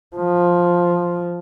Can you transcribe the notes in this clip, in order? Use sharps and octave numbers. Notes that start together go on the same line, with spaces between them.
F3